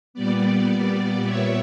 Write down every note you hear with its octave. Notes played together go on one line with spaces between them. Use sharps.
A#2 G3 B3 D5
A#2 G3 B3 C#5 E5